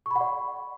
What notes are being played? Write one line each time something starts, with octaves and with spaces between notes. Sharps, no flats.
D5 F#5 B5 C#6